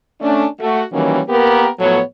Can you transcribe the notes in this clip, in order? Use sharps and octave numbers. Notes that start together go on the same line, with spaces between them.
A3 C#4 D4
A3 F#4
D#3 E3 F#3 G3 A#3 C#4
A#3 B3 G4 A#4
A2 F3 F#3 B3 A4 C#5